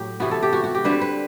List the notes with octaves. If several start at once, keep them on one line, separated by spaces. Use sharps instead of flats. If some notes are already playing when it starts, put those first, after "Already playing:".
Already playing: A2 F#3 G4
C3 E3 B3 F#4
A4
G4
F#4
F#4
G4
D3 G3 C4 B4
B4